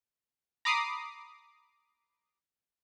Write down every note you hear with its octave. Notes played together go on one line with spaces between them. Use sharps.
A#5 B5 D6 D#6 C7